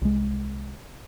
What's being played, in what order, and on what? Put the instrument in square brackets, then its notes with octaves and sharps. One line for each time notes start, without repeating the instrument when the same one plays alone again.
[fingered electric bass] C2 G#3